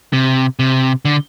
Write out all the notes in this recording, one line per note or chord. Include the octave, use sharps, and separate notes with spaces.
C3
C3
D3